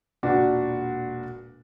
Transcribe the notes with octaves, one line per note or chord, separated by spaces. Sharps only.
E1 A#2 D4 F#4 B4 D5